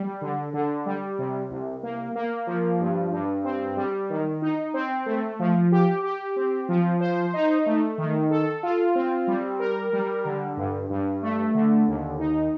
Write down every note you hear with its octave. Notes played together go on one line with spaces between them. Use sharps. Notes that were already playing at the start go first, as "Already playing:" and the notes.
Already playing: G3
D3
D3
G3
C3
C2
A#3
A#3
F3
G2
G2
C4
G3
D#3
D#4
C4
A3
F3
G4
G4
C4
F3
C5
D#4
A3
D#3
A4
F4
C4
G3
A#4
G3
D3
G2
G2
A3
D3
D#2
D#4